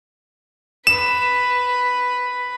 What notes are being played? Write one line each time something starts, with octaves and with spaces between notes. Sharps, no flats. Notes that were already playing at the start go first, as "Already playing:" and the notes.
B4 E7